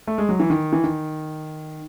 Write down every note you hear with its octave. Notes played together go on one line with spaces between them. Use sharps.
A3
G#3
F#3
E3
D#3
E3
D#3